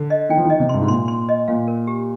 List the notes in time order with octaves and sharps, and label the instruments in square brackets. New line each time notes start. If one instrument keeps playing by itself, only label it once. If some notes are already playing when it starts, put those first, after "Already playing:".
Already playing: [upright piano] D3
[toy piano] D#5
[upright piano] D#3 [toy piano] G5
[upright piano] F3
[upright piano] D#3 [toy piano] D#5
[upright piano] C3
[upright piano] G2 [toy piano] C6
[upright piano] G#2
[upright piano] A#2 [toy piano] C6
[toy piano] C6
D#5
[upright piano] A#2 [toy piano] F5
[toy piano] A#4
G4